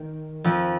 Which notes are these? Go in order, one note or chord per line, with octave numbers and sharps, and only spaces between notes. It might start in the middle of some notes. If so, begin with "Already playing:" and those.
Already playing: D#3
F2 F3